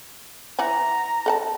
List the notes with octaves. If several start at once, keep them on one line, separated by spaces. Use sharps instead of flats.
E3 F#5 G#5 A#5
A4 F#5 A5